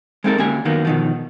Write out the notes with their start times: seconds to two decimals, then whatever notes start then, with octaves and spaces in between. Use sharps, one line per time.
0.24 G#3 B3 C4 D#4 A4 A#4
0.38 D2 A#3 C#4 G4 G#5
0.65 F#2 D#3 F#3 A#3 B3
0.85 B2 D#3 F3